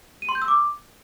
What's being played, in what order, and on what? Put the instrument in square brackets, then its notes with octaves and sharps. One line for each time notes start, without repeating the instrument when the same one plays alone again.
[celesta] D#7
C6
G6
E6
D6